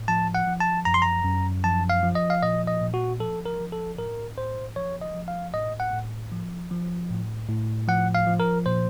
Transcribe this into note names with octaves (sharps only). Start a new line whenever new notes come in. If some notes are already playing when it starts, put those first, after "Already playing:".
Already playing: A2
F3 A5
F#5
F3
A5
F#2 A#5
C6
A#5
F#2
F3 A5
F5
F3
D#5
F5
A#2 D#5
D#5
A#2
F#4
F3 A4
A#4
F3
A4
A2 A#4
A2 C5
F3 C#5
D#5
F3
F5
A2 D#5
F#5
A2
F3
F3
A2
A2
F3 F#5
F5
F3
A#4
A#2 C5